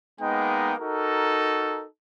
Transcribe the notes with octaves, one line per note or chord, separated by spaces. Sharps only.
G#3 A#3 B3 D#4 G5
D#4 F#4 A4 A#4